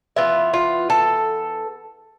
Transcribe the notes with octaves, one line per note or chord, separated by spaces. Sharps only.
E3 B3 F4 E5
F4
A4